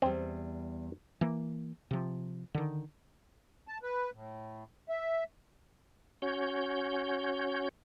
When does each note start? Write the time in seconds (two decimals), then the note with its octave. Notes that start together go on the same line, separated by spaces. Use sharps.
0.02 E2 G3 C4
1.21 E3 A#3
1.91 C3 F3
2.54 D3 D#3
3.68 A5
3.83 B4
4.13 A2
4.89 E5
6.22 C#4 F#4 C#5 G6